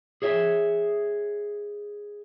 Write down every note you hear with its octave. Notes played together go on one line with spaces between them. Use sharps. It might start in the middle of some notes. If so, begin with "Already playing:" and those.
G#4 C#5 E5